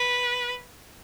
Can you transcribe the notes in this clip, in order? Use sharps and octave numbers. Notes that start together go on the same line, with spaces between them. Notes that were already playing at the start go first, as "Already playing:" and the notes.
Already playing: B4